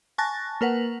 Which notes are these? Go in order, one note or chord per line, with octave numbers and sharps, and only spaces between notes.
G#5 A5 C#6 F#6 A6 A#6
A#3 A#4 B4 F#5